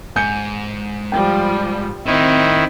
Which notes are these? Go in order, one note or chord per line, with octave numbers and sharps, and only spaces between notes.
G#2 G#5 G6 C#7
F3 G3 G5
A2 D#3 C4 D#4 E4